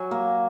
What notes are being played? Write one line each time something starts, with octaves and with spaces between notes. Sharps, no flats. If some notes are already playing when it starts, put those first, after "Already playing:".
Already playing: F#3 G#5
A#3